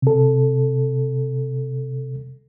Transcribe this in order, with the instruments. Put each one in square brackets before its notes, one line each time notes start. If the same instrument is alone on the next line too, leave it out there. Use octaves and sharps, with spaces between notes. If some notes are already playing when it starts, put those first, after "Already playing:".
[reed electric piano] C3 A4